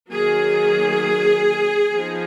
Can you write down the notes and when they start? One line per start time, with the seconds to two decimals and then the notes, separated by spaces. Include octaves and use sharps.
0.11 D#3 F#3 A#3 G#4
1.94 F3 B3 D#4